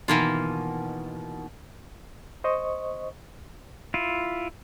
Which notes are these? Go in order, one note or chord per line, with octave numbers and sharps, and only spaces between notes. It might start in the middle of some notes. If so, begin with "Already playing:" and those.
B2 D#3 E3 A#3 F4
C5 D#5 C#6
E4 F4